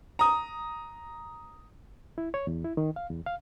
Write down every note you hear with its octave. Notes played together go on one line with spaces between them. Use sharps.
A#5 D#6
E4
C#5
E2
E4
D#3
F5
E2
F5